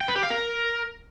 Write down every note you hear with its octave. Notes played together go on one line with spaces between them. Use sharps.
G5
B4
G4
F5
A#4